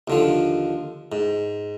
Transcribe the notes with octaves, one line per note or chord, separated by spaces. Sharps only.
D#2 D3 F3
G#2